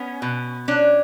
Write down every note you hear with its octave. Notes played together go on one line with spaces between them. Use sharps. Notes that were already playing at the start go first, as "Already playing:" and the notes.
Already playing: B3 C#4
B2
C#4 D4